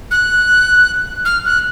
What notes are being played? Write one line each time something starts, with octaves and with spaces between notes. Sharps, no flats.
F#6
F6
F#6